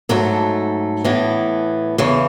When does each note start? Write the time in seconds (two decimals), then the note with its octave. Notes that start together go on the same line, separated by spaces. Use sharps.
0.09 G#2 F#3 A3 A4
1.05 A2 E3 B3
1.98 E2 C#3 E3